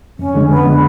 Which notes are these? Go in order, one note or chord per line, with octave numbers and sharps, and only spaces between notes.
F2 C#4
D3 G#3
F2 B3
D3 G#3